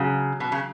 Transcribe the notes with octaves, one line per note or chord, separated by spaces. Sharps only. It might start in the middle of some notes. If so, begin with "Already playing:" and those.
Already playing: C#3 F#3
B2
C#3